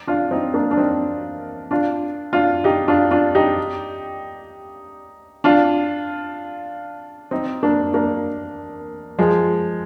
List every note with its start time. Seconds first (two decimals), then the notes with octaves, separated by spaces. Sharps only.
0.07 D4 F4
0.31 C4 D#4
0.54 A#3 D4
0.71 D4
0.77 C4 D#4
1.71 D4 F4
2.33 D4 F4
2.64 D#4 G4
2.88 D4 F4
3.11 D4 F4
3.35 D#4 G4
5.44 D4 F4
7.31 C4 D#4
7.63 A#3 D4
7.94 A#3 D4
9.18 F3 G#3